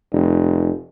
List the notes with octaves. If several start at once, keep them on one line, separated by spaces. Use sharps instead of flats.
F1